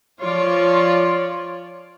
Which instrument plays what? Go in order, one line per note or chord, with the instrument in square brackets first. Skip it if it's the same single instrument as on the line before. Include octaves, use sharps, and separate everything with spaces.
[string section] F3 F4 C#5 D5